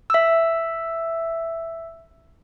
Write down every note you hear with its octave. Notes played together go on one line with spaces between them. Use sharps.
E5 E6